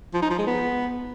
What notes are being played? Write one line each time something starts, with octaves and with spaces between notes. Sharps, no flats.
F3
D#4
F3
G#3
B3